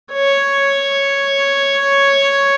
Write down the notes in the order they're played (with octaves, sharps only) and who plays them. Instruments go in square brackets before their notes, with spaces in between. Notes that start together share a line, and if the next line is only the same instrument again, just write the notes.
[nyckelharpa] C#5